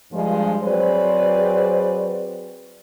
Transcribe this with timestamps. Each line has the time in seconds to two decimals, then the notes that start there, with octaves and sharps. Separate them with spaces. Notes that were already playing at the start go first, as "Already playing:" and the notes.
0.13 G2 F3 G#3
0.64 F#3 C4 G#4 B4 C5 D5